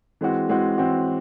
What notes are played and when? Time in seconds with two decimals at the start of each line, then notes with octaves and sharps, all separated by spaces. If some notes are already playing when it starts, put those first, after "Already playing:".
0.21 E3 G#3 C4 F#4
0.49 E3 G#3 C4 F#4
0.78 E3 G#3 C4 F#4